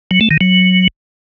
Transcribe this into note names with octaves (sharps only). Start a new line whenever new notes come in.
F#3
A3
D#3
F#3